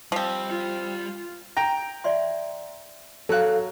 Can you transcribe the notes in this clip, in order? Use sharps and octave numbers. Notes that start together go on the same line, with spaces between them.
F3 G3 C4
F4
G5 A#5
D5 E5 C6
F#3 A4 F5 F#6